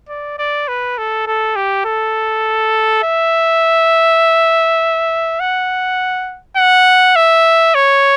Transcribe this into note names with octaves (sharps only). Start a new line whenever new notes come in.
D5
D5
B4
A4
A4
G4
A4
E5
F#5
F#5
E5
C#5